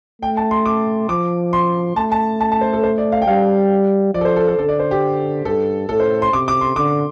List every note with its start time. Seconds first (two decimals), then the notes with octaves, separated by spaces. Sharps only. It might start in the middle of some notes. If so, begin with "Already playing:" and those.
0.22 A3 G5
0.37 A5
0.51 C6
0.66 D6
1.09 F3 D6
1.53 C6
1.96 A3 A5
2.12 A5
2.40 A5
2.52 A5
2.61 C5
2.73 A4
2.83 C5
2.98 D5
3.12 F5
3.22 G5
3.27 G3 F5
4.14 F3 D5
4.21 A4
4.25 C5
4.36 A4
4.48 A4
4.59 D3 A4
4.69 D5
4.79 C5
4.91 G4
5.45 G2 A4
5.89 A2 A4
6.00 C5
6.22 C6
6.33 C3 D6
6.48 D6
6.61 C6
6.76 D3 D6